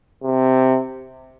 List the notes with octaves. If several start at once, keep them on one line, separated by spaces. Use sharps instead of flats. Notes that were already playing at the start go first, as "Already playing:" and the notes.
C3